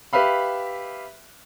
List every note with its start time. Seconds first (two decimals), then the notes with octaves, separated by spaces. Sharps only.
0.13 G4 B4 E5 F5 B5